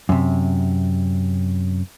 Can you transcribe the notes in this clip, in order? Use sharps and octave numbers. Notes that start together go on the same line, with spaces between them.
F#2 C3